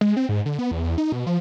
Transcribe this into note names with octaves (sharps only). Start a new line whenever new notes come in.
G#3
C4
G#2
D3
B3
E2
E2
D#4
B2
F3